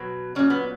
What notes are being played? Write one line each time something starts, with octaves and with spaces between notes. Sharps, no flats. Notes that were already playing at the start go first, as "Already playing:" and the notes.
Already playing: B2 F#3 B3
A#2 F#3 C#4
B3